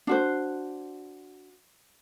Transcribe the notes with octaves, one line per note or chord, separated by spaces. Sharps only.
D4 F#4 C5